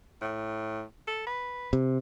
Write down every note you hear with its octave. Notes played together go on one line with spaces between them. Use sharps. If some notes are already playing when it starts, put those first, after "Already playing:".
A2
A4
B4
C3